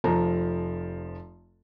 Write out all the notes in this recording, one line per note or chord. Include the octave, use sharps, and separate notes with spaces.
F1 F3 A#5